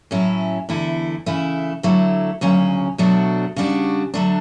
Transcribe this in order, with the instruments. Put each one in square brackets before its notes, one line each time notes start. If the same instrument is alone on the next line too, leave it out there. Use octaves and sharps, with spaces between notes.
[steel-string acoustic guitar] A2 F#3 C#4 E4
E2 D3 A3 E4
C#3 E3 A3 E4
D3 F#3 A3 E4
D2 C#3 F#3 C#4
B2 F#3 A3 D4 F#4
C#3 G3 D4 F#4
D3 F#3 A3 D4